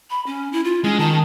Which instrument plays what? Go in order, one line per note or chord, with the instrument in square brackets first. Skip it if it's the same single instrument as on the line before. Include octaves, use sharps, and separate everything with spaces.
[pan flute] B5
C#4
E4
F4
[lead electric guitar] G#3 [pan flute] C#4
[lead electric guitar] D#3 [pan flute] A5